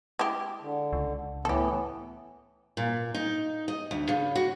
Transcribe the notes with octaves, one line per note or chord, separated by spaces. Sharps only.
G#3 E4 G4
D3
C#2
A2 E3 B3 G4 A4
A#2
D#4
D#5
D2
C#3
F#4